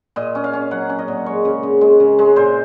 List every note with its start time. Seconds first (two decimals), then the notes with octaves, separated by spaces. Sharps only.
0.16 A#2 D#5
0.35 C#4
0.44 F5
0.53 C#4
0.71 F#3 F#5
0.89 C#4
0.99 D#5
1.08 A#2
1.26 G#3 C#5
1.45 C#3
1.63 C#3
1.81 G#3
2.00 C#3
2.19 G#3
2.36 A#2 C5